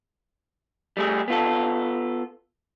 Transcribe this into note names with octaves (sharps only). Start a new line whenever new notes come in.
G3 A3 G#4
B3 F4 A4